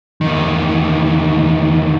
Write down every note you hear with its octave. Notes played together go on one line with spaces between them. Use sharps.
E2 D#3